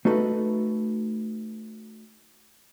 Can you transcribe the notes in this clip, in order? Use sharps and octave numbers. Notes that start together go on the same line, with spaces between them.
A3 D#4 F#4 A4 B4